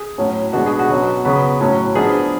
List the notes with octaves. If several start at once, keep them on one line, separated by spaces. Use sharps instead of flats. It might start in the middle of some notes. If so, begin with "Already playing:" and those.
Already playing: G#4
A2 F#3 C#4
B2 G#3 B3 D4 F#4
G#4
F#4
B2 F#3 C#4
C#3 F#3 B3
A2 F#3 C#4
F3 B3 D4 G#4